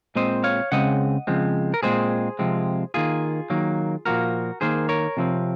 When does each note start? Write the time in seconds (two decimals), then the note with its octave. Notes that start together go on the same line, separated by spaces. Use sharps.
0.16 A#2 G#3 C4 C5 D#5
0.44 C#5 F5
0.72 C#3 G#3 C4 D#5 F#5
1.27 C#3 F3 G#3 C4
1.74 A#4
1.83 A#2 G#3 C4 G#4 C5
2.39 C3 F3 G#3 C4
2.94 D#3 A#3 F4 G#4
3.50 D#3 F#3 A#3
4.06 A#2 F3 A#3 F#4 A#4
4.61 D#3 A#3 G#4 C5
4.89 A#4 C#5
5.17 C3 F3 C4